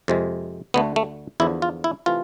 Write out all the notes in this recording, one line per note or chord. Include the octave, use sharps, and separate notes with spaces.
F2 C3 G#3
D2 D3 A3 B3
A3
E2 D3 F3 E4
F4
E4
C3 E3 A3 F4